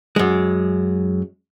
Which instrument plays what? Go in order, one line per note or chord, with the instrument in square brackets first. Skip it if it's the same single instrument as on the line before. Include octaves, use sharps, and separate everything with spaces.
[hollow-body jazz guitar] F#2 G#3